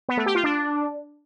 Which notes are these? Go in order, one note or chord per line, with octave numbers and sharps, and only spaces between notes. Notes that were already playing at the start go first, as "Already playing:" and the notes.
B3
A3
G4
F4
D4